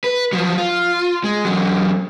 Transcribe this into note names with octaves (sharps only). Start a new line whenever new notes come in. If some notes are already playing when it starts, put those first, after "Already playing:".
B4
F3 F#3
F4
G#3
E2 F#3